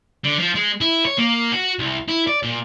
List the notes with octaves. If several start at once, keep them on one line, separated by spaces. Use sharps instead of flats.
D3
F3
G#3
E4
C#5
A#3
F#4
C2
E4
D5
A#2